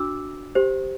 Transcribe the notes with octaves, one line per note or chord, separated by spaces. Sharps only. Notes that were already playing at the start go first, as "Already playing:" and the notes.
Already playing: D4 F#4 D6 E6
G4 C5